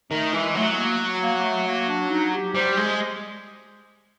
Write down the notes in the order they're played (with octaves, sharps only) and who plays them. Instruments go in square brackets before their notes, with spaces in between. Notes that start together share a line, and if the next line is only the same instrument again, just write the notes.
[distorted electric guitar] D#3 [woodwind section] A3
[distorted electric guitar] E3 [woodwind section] G#3
[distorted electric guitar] F#3 [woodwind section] A3
[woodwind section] B3
A#3
A#3
A#3
A3
A#3
D4
D#4
G4
[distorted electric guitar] G3 [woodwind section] C5
[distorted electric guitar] G#3